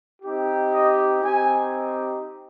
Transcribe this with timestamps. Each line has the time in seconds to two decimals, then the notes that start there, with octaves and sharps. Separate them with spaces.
0.23 C4 D#4 G4
0.73 D#5
1.22 C4 D#4 G4 G#5